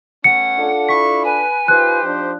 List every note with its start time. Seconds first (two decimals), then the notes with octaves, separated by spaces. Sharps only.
0.24 A3 B3 C#4 F#5 C#7
0.58 D4 F4 A4
0.89 E4 B5 C#6 B6
1.24 B4 G#5
1.68 D#4 F4 G4 B4 C5 F#6
2.03 F3 D4